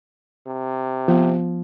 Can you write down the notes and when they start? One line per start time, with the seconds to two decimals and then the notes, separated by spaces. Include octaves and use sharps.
0.47 C3
1.08 F3 B3